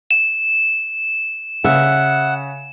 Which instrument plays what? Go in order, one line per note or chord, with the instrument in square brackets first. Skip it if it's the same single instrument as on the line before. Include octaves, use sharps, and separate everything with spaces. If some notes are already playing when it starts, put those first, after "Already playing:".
[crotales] E7
[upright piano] C#3 [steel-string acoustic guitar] E5 [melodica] F#5